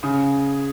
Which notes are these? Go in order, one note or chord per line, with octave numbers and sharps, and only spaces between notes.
C#3 G#4